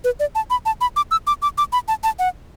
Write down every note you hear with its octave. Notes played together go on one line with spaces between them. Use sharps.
B4
D5
A5
B5
A5
B5
D6
E6
D6
D6
D6
B5
A5
A5
F#5